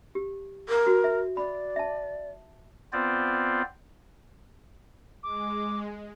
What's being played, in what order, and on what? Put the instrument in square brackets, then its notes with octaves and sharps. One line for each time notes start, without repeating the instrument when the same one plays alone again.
[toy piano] G4
[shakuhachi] A#4
[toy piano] F#4
E5
[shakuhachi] D5 [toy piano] B5
[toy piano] E5 A5
[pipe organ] B3 C4 F4 C5 D5
[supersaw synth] G#3 [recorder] D6